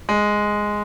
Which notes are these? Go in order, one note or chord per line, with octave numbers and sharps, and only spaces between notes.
G#3